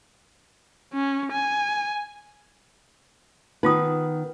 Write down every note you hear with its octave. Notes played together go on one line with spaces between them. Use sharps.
C#4
G#5
D#3 B3 D#4 F4 B4 D#6